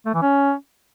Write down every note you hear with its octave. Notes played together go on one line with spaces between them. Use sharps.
A3
E3
C#4